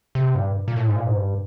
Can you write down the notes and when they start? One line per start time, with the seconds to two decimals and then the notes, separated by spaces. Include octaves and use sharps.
0.15 C3
0.35 G2
0.68 A#2
0.76 A2
0.86 G#2
0.96 A#2
1.06 G#2
1.16 G2